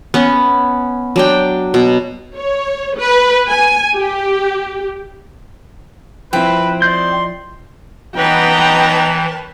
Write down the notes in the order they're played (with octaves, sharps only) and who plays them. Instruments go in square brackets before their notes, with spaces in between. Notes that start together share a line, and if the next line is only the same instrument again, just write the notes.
[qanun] B3 C#4
F#3 D4 G5
B2
[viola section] C#5
B4
G#5
G4
[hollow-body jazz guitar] F3 E4 [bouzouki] C4 [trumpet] B4
[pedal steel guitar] D5 D#5 G6 [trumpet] C6
[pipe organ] E3 [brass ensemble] B3 D#4 A#5 [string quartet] B4 C#5 A5 [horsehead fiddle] G5